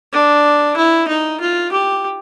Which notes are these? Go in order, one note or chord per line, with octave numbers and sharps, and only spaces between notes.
D4
E4
D#4
F4
G4